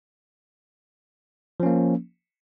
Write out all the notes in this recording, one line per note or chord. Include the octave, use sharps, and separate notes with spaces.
F3 A#3 C#4